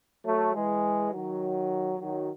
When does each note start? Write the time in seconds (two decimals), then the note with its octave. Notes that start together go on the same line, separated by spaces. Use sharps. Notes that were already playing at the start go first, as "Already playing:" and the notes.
0.24 F#3 A3
0.53 E3 G#3
1.12 D#3 F#3
1.99 D#3 F#3